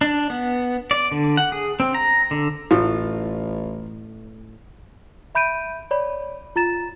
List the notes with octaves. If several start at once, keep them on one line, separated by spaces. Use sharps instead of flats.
D4
B3
D5
D3
F#5
G#4
C4
A#5
D3
A1 A2 F4
E5 B5 G6 D7 D#7
C#5 D5 B5
F4 A#5 A6 E7